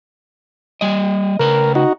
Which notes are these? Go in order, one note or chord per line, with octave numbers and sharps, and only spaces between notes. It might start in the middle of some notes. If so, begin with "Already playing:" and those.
G3 D#5
C#3 A#4 B4
D#4 F#4